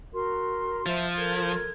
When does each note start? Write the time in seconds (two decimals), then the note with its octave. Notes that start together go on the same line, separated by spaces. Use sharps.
0.13 F#4 A#4 C6
0.86 F3 C5 E5
1.17 A4 A#4 G#6